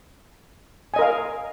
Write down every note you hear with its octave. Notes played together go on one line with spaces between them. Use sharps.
A#4 D#5 F5 G#5